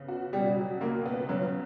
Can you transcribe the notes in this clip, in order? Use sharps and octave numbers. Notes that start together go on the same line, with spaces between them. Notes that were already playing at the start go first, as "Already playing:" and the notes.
Already playing: C#3 B3
F#4
B2 G3
F#3
C#2 A#3
B3
C#3 F#3